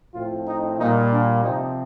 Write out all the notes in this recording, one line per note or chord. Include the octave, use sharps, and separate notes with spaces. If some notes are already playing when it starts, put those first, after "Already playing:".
A2 F3 C4 F4
D#4
A#2 G3 A#3 D#4
D4
C3 F3 C4 D#4